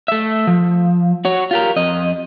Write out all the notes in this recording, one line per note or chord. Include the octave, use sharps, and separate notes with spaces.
A3 E5
F3
F#4 C#5
F4 G4 A#4
F2 D#5